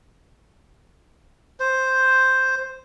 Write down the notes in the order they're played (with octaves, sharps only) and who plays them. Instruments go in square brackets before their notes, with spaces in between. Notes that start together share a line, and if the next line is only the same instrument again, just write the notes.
[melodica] C5